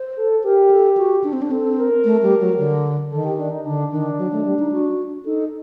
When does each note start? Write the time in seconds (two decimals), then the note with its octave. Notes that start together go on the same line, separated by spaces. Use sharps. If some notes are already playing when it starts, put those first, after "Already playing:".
Already playing: C5
0.17 A4
0.44 G4 A#4
0.71 A4
0.97 F#4
1.24 D4
1.33 C4
1.42 D4
1.51 C4 A4
1.78 A#4
2.04 A3
2.22 G3
2.40 F#3
2.58 D3
3.11 D#3 A4
3.25 G4
3.39 D4
3.51 D#4
3.65 D3 D4
3.91 D#3 D4
4.18 F#3
4.32 A3
4.45 G3
4.59 D#4
4.72 F#4
5.25 D#4 A4